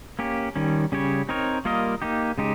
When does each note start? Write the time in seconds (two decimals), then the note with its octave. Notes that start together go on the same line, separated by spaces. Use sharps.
0.19 A#3 C#4 G4
0.56 D#3 G3 C#4
0.92 C#3 G3 C#4 G4 C#5
1.29 C4 D#4 A#4 C#5
1.65 G3 A#3 F4 A#4 D#5
2.02 A#3 D#4 G4
2.38 C#3 G#3 D#4 G4